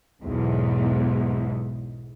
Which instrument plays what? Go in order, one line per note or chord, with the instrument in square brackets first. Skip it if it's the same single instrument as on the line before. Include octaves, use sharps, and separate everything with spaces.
[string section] B1 E2 G#2